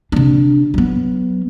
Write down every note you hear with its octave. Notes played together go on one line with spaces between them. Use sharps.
C3 D4
F#3 B3